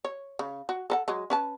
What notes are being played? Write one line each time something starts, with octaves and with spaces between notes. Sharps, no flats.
C#5
C#3
F#4
A4 A#4 F#5
F#3 G#3
C#4 B4 A5